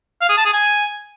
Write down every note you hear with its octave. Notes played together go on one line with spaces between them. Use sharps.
F5
G#4
A5
G#4
G#5